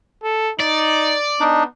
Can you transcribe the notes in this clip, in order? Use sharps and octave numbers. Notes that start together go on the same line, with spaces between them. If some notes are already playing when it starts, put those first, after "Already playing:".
A4
D#4 D5
B3 D4 D#4